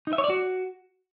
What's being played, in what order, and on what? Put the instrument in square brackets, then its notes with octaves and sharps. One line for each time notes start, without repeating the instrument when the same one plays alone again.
[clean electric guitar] D#4
E5
C#5
D5
F#4